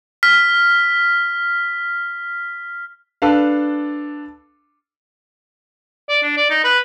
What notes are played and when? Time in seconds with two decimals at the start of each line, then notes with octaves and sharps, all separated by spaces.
0.23 F6 B6
3.22 D4 A4 B4 F5
6.09 D5
6.23 D4
6.37 D5
6.50 D#4
6.64 B4